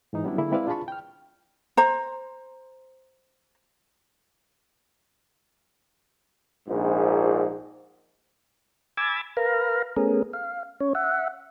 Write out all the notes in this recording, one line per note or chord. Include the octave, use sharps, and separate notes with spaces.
G#2 E3 D#4
F#3 G3 B3 C#4 D4 E4
D3 A#3 E4 G#4
G#3 C4 E4 B4 D5 F5
D4 F4 G#4 A5 B5 C#6
G5 F6
C5 A#5
A#1 G#2
G#5 B5 D6 E6 G#6 A6
A#4 B4 F5 A#5
A3 B3 C#4 G#4 A#4
F5
C#4 C#5
E5 F#5